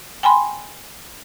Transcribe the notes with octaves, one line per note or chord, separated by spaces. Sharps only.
G5 G#5 B5 C6